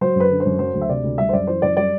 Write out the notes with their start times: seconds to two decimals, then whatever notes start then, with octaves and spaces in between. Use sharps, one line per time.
0.01 F#3 C5
0.16 F#2 B4
0.30 D3
0.40 C5
0.45 F#2
0.59 F#3 C5
0.74 D2
0.81 E5
0.89 C3 D5
1.04 D2
1.18 G3 E5
1.29 C5
1.33 F#2 D5
1.47 E3 C5
1.62 F#2 D5
1.77 G3 D5